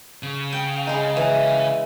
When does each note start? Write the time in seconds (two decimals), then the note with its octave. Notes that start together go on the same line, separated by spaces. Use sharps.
0.23 C#3
0.52 G5
0.87 G#3 D#4
1.17 E3